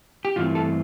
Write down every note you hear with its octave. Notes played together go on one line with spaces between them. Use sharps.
G4
G2 E3 A3 C4 F4
A4